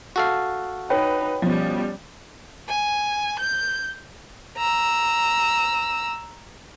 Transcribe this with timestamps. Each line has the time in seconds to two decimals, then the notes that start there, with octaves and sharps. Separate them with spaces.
0.16 F#4 A4 F5
0.90 D#4 B4 C#5 G5
1.42 B2 F3 G3 C#4
2.69 G#5
3.40 G6
4.58 A#5 E6